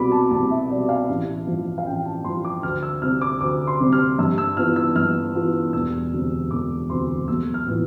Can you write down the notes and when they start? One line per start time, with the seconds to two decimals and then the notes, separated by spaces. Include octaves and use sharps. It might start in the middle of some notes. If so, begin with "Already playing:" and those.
Already playing: C2 B2 G3 B5 D6
0.12 A5
0.31 C2 A5
0.51 E5
0.70 B2 G3 D5
0.89 F5
1.09 A1
1.47 G2 F3
1.78 F5
1.86 A1 G5
2.05 A5
2.24 G2 F3 C6
2.45 D6
2.63 D2 F6
2.83 E6
3.02 C3 G3 C4 F6
3.21 D6
3.41 D2 D6
3.67 C6
3.80 C3 G3 C4
3.92 F6
4.19 G2 E6
4.38 E6
4.57 E3 B3 F4 F6
4.76 E6
4.96 G2 F6
5.35 E3 B3 F4
5.73 E1 E6
6.12 D2 C3 G3
6.51 E1 D6
6.89 D2 C3 G3 C6
7.28 B1 E6
7.54 F6
7.67 A2 E3 B3 F4